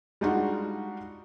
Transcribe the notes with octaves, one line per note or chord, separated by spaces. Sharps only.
G3 G#3 D4 D#4 F4 F#4